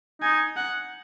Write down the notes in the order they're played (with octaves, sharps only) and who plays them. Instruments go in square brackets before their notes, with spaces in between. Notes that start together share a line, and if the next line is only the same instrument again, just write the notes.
[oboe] D#4 [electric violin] G#5
[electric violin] F#5